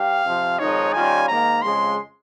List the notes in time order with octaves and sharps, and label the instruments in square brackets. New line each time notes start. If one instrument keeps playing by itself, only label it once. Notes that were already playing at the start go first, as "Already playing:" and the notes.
Already playing: [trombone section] G2 G4 [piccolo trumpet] F5
[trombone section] F2 C3 F3
[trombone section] F2 D#3 G#3 D#4 [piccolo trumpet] C#5
[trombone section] D#3 G3 C#4 F4 [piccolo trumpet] G#5
[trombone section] G#2 D#3 A#3 [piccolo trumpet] A#5
[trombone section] F2 C#3 G#3 [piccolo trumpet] C6